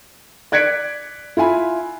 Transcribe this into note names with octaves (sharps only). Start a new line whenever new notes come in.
D5 F#6 G#6 B6 C#7 D7
E4 F4 G#5 B5